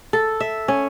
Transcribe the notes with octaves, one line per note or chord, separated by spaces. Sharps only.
A4
E5
C#4